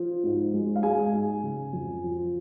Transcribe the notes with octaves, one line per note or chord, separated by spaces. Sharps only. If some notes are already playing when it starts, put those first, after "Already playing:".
Already playing: F3
G#2
G#3
F5
G#3 G#4 G#5
G#2
C#3
F2
F3